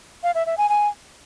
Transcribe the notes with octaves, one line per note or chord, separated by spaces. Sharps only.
F5
E5
E5
G#5
G#5